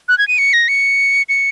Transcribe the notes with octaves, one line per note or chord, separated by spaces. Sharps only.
F#6
G#6
D#7
C#7
A#6
C#7
C#7